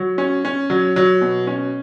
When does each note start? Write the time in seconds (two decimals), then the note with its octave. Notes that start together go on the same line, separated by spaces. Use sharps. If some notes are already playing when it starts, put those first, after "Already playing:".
Already playing: F#3
0.18 C#4
0.45 C#4
0.70 F#3
0.96 F#3
1.21 B2
1.47 C#4